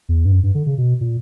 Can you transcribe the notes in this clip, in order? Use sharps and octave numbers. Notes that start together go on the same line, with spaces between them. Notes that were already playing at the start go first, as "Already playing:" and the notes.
E2
G2
F#2
G2
D3
C#3
B2
A#2